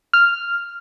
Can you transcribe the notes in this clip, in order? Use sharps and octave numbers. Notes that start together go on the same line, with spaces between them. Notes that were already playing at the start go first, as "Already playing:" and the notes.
F6